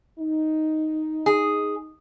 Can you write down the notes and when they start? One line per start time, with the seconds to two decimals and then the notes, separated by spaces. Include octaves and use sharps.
0.19 D#4
1.26 G#4